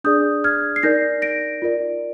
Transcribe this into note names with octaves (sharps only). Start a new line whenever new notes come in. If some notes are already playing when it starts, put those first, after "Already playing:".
D4 G#4 D5 D#6 G6
F6 G#6
C7
D#4 A#4 D5 G6 A#6
A#6 D7
F4 A#4 D5